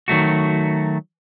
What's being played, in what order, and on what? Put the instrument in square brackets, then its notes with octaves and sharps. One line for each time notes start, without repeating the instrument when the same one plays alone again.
[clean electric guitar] D#3 F#3 A3 F#4